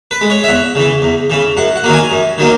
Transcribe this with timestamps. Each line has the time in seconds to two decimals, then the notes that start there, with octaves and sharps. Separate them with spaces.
0.11 B4
0.21 G#3
0.30 C#5
0.44 E5
0.48 E2 F#5
0.75 C#3 E3
1.02 E2
1.30 C#3 E3
1.57 F#2 F#5
1.76 F#5
1.84 D#3 F#3 A#3
1.94 G#5
2.12 F#2
2.38 D#3 F#3 A#3